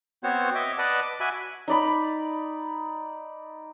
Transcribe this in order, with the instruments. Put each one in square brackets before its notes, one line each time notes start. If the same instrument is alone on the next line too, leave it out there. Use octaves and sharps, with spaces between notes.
[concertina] B3 C4 F#4 C5 C#5
D#5 E5 D6
B4 D5 D#5 F#5 A5
D6
F#4 E5 G#5 B5
[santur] D#4 D5 B5